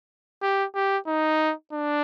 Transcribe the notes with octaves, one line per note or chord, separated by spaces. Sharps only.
G4
G4
D#4
D4